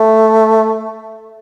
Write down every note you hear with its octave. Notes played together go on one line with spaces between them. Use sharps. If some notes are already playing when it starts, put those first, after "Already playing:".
Already playing: A3